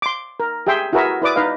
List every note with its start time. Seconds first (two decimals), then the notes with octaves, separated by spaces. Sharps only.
0.02 C6 D6
0.40 A#4
0.67 G4 G#4 E5 G5 C6
0.93 E4 F#4 G#4 A#4 B4 E5
1.22 E4 B4 D5 D6 D#6
1.36 D#4 B4 D#5 F5